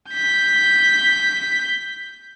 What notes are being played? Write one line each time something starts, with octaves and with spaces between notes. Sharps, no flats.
G6 B6